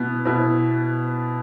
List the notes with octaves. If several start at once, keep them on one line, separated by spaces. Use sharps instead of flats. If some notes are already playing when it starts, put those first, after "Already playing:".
Already playing: B2 B3 E4
B2 B3 E4